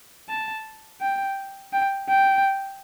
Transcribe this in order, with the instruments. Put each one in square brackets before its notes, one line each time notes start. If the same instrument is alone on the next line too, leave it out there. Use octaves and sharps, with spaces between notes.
[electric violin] A5
G5
G5
G5